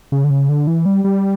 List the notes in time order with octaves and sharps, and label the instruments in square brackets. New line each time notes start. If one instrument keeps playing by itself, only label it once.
[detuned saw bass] C#3
D3
C#3
D3
E3
G3
G3